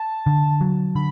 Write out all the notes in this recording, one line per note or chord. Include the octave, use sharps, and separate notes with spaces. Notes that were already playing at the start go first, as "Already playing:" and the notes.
Already playing: A5
D3
F#3
D3 B5